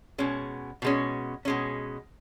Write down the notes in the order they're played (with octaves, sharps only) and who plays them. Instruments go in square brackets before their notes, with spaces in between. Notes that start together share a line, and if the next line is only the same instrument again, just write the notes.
[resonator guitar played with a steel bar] B2 G#3 C#4
B2 G#3 C#4
B2 G#3 C#4